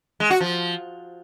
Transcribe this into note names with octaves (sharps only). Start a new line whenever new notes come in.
G#3
F#4
F3